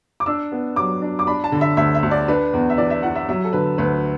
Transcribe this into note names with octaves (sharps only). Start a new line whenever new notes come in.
D6
D4 E6
B3
F#3 D6
D4
D6
D4 B5
A5
D3
E5
D2 E5
E5
D2
D5
D4 B4
E2
E5
E3 D5
E5
E3 F#5
E5
F#3 E5
A4
D3 B4
D2 B4